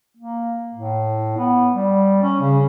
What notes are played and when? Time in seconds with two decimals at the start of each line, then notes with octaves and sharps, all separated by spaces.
0.17 A#3
0.74 A2
1.37 B3
1.73 G3
2.22 C#4
2.40 C#3